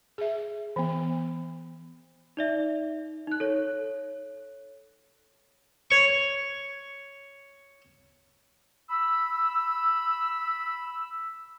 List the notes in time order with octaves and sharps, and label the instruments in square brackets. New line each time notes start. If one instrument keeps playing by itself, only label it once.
[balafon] G#4 E5
E3 B3
[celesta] D#4 D5 E5
D#4 F#6
A4 C#5
[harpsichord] C#5 C#6
[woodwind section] B5 E6